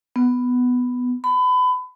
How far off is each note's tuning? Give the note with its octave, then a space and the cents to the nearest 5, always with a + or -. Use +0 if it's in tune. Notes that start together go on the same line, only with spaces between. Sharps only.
B3 +5
B5 +30